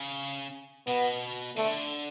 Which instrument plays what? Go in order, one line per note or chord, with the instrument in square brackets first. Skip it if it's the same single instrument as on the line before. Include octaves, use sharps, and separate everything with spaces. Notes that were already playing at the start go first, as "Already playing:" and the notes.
Already playing: [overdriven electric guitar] C#3
[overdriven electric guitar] B2 [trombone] B3
[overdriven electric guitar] D3 [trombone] A3